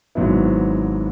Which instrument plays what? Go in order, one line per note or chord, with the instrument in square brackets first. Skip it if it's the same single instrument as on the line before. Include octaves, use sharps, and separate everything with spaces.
[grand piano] G#1 G#2 F#3 B3 E4